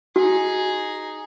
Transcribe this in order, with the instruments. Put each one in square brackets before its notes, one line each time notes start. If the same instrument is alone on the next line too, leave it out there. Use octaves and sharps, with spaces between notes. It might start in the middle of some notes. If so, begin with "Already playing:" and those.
[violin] D#4 G#4 [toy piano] F#4